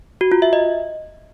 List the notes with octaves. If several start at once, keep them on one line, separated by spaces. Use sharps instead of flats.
F#4
F4
E5
D#5